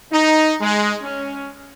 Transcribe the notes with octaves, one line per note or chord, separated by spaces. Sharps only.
D#4
G#3
C#4